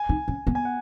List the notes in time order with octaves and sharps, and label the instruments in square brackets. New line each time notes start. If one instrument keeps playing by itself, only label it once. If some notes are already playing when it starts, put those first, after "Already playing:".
Already playing: [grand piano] G#5
[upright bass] D#4
C#4
B3
[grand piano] G#5
F#5